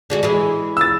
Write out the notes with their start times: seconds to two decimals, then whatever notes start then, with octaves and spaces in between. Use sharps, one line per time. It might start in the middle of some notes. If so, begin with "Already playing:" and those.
0.10 D3 G#3 F#4
0.23 E3 G#3 G#4
0.77 E6 A6